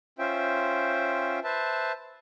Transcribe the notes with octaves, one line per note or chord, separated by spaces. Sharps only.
C#4 F4 C5 E5 G5
B4 C5 E5 A5